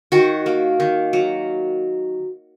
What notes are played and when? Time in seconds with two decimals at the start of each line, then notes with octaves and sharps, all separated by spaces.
0.12 D#3 F#4
0.46 A#3
0.80 D#3
1.13 F#3